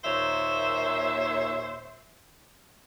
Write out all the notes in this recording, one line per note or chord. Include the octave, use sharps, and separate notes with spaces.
D#2 A#2 C5 C#5 E5